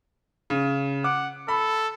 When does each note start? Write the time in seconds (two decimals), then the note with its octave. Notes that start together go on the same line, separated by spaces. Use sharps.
0.50 C#3
1.04 F#5 D6
1.48 A4 B5